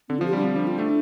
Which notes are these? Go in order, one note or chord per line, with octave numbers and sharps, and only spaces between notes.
D3 C4
F3 F4
G4
G3
D4
F3 C4
F3 D4
F4
A3 D4